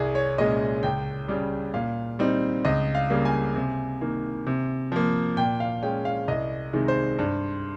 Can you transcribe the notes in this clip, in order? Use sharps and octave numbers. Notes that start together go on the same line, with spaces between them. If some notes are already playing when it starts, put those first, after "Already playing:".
Already playing: C2 G#4
C#5
A#2 G#3 C#4 D#5
C#2 G5
C#3 G3
A#2 F5
G3 C4 D#4
C#2 D#5
F5
C#3 G3 A#3
G#5
C3
D#3 A#3
C3
F3 A#3
A#2 G5
F5
G#3 C#4 G5
F5
C2 D#5
C3 D#3 G#3
C5
G2